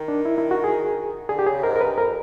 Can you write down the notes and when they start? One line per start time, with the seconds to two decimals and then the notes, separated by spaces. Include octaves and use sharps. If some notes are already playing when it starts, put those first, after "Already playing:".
Already playing: D#3
0.08 D4
0.25 E4
0.38 E4
0.51 F#4
0.64 G#4
1.29 D3 G#4
1.39 G4
1.46 C#3 G#4
1.63 G#2 A#4
1.76 A#4
1.81 G2 B4
1.98 F2 A#4